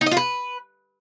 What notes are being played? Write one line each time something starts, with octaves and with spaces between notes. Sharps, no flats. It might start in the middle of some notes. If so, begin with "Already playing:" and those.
D#4
D#5
F4
B4